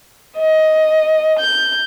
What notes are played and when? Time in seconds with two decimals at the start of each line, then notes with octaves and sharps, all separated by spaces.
0.38 D#5
1.40 G6